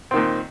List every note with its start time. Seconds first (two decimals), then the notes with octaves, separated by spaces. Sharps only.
0.11 C4
0.14 D#3
0.16 A#2